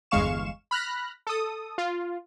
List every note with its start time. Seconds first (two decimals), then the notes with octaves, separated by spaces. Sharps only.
0.11 G1 E2 G#3 F5 C#6 E7
0.71 B5 F6 F#6 A#6
1.27 A4 D#6
1.78 F4